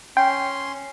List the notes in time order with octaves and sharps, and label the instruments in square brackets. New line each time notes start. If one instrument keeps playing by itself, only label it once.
[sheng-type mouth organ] C#4 C6 [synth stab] G5